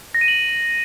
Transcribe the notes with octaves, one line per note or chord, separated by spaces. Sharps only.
A#6
D#7
F#7